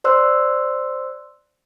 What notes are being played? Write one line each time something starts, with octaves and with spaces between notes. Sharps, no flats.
C5 D5 C6 E6 F#6